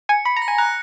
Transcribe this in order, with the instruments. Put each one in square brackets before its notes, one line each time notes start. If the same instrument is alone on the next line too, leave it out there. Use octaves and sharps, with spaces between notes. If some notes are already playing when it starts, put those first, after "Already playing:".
[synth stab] G#5 [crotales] C#7
[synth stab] B5 [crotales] C#7
[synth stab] A#5
[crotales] A#6
[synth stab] G#5
[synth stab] A#5 [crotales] F#6